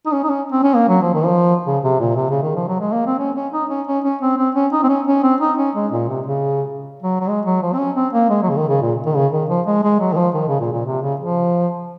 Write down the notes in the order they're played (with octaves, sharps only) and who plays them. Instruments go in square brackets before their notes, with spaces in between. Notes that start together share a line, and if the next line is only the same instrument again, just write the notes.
[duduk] D#4
C#4
D#4
C#4
C4
C#4
A#3
F#3
F3
D#3
F3
C#3
C3
A#2
C3
C#3
D#3
F3
F#3
G#3
A#3
C4
C#4
C#4
D#4
C#4
C#4
C#4
C4
C4
C#4
D#4
C4
C#4
C#4
C4
D#4
C#4
G#3
A#2
C3
C#3
F#3
F#3
G#3
F#3
F3
C4
C#4
C4
A#3
G#3
F#3
C#3
D#3
C#3
A#2
D#3
C#3
D#3
F3
G#3
G#3
F#3
D#3
F3
D#3
C#3
A#2
A#2
C3
C#3
F3